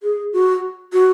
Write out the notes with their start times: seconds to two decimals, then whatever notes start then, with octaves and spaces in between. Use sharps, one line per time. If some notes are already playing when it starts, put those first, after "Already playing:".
0.03 G#4
0.33 F#4
0.93 F#4